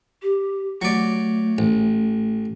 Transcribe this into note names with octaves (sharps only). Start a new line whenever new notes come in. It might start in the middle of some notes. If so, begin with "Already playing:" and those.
G4
F#3 A3 D5
A1